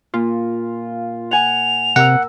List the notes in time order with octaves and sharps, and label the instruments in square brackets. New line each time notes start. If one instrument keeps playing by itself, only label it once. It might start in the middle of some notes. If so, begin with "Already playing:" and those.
[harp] A#2 [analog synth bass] F4
[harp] F#5 G#5 [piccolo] F7
[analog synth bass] C3 [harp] A#4 E6 [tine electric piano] F#5